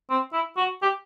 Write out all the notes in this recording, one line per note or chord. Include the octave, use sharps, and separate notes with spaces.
C4
E4
F#4
G4